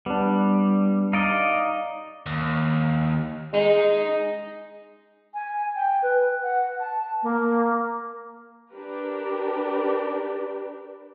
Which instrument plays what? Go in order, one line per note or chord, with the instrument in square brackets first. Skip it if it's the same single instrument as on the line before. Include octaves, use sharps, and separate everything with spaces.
[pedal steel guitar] G3 [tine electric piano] B3 D4
[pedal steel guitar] D#4 D5 D#5 [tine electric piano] F5
[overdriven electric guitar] D#2
[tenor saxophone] G#3 [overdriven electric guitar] D#4
[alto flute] G#5
G5
B4
F#5
A5
A#3
[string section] D4 G4 A#4 B4